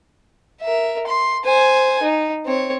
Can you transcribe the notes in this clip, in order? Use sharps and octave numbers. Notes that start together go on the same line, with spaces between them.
A#4 E5
C6
C5 G#5
D#4
C4 C#5